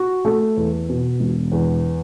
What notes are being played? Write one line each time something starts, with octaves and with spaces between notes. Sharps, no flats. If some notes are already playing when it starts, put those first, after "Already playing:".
Already playing: F#4
A3
E2
B2
E1
E2